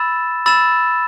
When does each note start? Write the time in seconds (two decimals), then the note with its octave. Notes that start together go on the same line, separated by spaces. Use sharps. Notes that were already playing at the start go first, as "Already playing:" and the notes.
Already playing: B5 E6 A6 E7
0.46 B5 E6 A6 E7